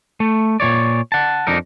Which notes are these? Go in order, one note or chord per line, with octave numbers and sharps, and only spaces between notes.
A3
A#2 F3 C#5 D5
F#5 A5
F2 D4 D#4 A#4